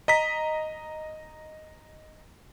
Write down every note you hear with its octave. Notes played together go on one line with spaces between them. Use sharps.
D#5 A#5 B6